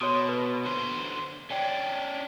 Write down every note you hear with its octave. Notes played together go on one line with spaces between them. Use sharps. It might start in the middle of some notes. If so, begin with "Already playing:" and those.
B2 C#5 C6 D#6
B4
D3 C5
C#4 D4 G5